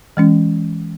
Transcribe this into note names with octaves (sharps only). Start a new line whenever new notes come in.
E3 G#3 C#4